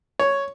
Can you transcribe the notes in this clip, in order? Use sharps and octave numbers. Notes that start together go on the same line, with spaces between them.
C#5